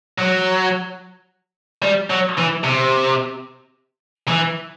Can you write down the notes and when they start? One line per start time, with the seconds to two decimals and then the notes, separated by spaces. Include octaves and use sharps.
0.19 F#3
1.82 G3
2.10 F#3
2.37 E3
2.64 C3
4.28 E3